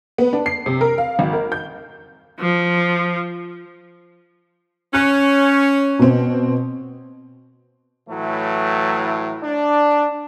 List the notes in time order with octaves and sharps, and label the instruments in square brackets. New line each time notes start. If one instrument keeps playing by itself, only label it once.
[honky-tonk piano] B3
D4
C7
C3
A#4
F5
G#1
A#4
G6
[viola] F3
[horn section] C#4 [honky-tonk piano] F#6
[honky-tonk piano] B2 C4
[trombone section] A2 E3 F#3 A3
D4